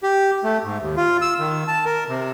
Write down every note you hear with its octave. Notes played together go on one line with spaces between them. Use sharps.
G4
A3
G#2
D#2
F4
E6
D#3
A5
A#4
C3